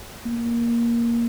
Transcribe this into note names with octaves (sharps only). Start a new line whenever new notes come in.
A#3